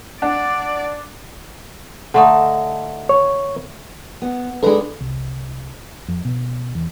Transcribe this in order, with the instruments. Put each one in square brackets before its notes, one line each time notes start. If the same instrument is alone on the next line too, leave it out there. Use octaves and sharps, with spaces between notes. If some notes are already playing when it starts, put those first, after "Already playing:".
[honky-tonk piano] D4 [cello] D5 [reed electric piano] F#5
[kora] D3 A3 D#4
[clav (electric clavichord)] C#5
[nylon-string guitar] B3
[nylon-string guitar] G#3 D4 D#4 [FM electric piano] A4 B4
[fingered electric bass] C2
F2
B2
E2